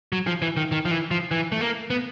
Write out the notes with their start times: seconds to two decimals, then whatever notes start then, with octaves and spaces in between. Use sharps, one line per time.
0.12 F#3
0.27 F3
0.42 E3
0.57 D#3
0.72 D#3
0.85 F3
0.91 E3
1.11 F3
1.31 E3
1.52 A3
1.61 A#3
1.90 B3